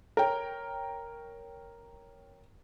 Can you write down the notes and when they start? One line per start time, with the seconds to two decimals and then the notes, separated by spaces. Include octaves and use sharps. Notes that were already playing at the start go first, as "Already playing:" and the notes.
0.17 A#4 C#5 G5